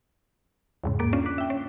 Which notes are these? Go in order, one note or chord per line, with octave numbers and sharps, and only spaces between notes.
E2 G#2 C#3
G#2 A#3 D6 D7
C#4 D4 F4
D6 F#6 B6
E5 G5
C#4